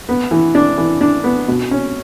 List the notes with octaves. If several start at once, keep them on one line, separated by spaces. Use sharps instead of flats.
B3
E3
D4
E3
D4
B3
B2
C#4